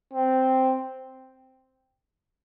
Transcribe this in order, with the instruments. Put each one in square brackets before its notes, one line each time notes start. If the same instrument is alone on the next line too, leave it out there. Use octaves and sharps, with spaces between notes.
[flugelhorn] C4